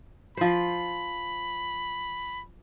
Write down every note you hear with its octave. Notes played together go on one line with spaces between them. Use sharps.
F3 C5 B5